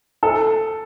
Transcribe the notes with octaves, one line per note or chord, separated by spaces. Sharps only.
A4